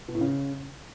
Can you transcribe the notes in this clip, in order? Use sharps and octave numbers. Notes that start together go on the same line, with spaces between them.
B2
A2
C#3